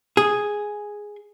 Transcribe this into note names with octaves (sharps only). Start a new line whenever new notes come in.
G#4